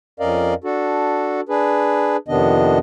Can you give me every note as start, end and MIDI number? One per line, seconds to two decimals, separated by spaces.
0.20 0.54 41
0.20 0.54 61
0.20 0.54 70
0.20 0.54 74
0.20 0.54 75
0.20 0.54 77
0.64 1.41 62
0.64 1.41 66
0.64 1.41 69
1.49 2.17 62
1.49 2.17 68
1.49 2.17 71
2.28 2.78 41
2.28 2.78 48
2.28 2.78 51
2.28 2.78 59
2.28 2.78 62
2.28 2.78 75